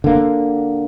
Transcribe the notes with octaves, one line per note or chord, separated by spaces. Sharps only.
D3 A#3